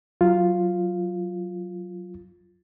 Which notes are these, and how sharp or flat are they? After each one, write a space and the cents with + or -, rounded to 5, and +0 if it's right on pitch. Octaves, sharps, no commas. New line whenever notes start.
F#3 +0 F4 +0